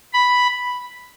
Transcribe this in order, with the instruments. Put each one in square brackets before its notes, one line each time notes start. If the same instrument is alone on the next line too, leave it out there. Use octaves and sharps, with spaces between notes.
[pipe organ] B5